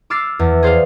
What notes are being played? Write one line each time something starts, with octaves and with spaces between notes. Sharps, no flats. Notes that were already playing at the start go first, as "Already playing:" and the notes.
D6 E6 F6 A6 C7
E2
G#4 C5 D5 F5